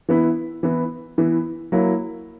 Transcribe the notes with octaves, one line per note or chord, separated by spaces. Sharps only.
E3 B3 E4
E3 B3 E4
E3 B3 E4
F#3 A#3 E4